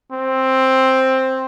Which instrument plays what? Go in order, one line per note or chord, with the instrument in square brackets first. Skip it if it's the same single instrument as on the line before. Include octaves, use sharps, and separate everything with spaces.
[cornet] C4